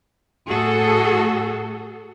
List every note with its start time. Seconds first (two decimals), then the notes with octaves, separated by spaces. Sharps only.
0.48 A2 F#4 G#4 A4